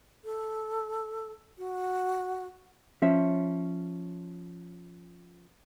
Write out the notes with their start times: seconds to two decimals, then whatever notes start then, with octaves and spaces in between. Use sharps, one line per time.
0.25 A4
1.58 F#4
3.02 F3 C#4 E5